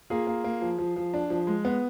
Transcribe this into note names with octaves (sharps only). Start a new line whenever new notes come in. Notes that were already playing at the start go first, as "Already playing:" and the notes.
A#3 F4 G#4
A#3
A#3
F3
F3
F3
D4
F3
G#3
B3